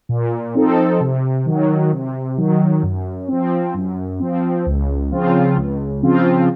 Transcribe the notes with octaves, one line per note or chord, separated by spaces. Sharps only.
A#2
F3 C4 D#4 A4
C3
D#3 F#3
C3
D#3 F#3
F#2
F3 C4
F#2
F3 C4
C#2
C#3 F3 C4 F4
C#2
C#3 F3 C4 F4